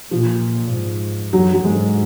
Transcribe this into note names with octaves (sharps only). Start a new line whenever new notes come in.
A#2 F3
G#2
F#2 F#3
F#3
G#2 G#3